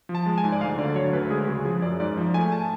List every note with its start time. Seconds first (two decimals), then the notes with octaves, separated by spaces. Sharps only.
0.09 F3
0.15 A5
0.26 G#3
0.38 G#5
0.44 G#2
0.52 D5
0.61 D2 F5
0.78 D3 D5
0.95 F#3 C#5
1.13 D2 B4
1.30 G#3 G#4
1.47 C#3 F#4
1.65 F3 G#4
1.82 F#2 D5
2.00 G#2 D5
2.17 F3
2.34 A3 G#5
2.52 A5